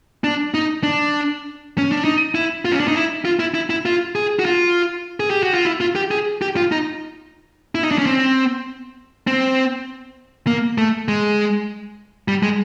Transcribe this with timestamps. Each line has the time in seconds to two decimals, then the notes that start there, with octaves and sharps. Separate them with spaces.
0.24 D4
0.54 D#4
0.83 D4
1.78 C#4
1.92 D4
2.04 D#4
2.35 E4
2.65 F4
2.72 C#4
2.80 D4
2.88 D#4
2.95 E4
3.25 F4
3.39 E4
3.54 E4
3.70 E4
3.86 F4
4.15 G#4
4.39 F#4
4.45 F4
5.20 G#4
5.30 G4
5.43 F#4
5.54 F4
5.65 E4
5.81 F4
5.95 G4
6.11 G#4
6.42 G4
6.57 F4
6.72 D#4
7.75 E4
7.83 D#4
7.91 D4
7.99 C#4
8.06 C4
9.27 C4
10.47 A#3
10.78 A3
11.08 G#3
12.28 G3
12.43 G#3